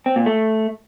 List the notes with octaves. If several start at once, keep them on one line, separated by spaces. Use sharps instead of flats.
C4
A#2
A3